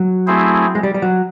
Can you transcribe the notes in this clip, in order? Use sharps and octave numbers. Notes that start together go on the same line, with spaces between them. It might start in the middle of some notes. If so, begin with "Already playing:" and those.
Already playing: F#3
A3 C4 E4 G#4 C5
G#3
G3
G3
F#3